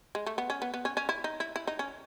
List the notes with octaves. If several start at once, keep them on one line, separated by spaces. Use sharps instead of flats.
G#3
A3
B3
C#4
B3
B3
C#4
C#4
E4
D#4
E4
E4
D#4
C#4